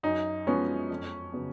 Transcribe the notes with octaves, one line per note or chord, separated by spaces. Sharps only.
F#2 D#4
F3 G#3 B3 C#4
F2
C#3 F#3 B3